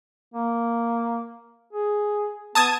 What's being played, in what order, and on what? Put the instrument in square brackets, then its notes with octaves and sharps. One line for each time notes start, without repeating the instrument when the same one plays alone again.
[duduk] A#3
G#4
[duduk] B3 [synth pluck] A5 D#6 G#6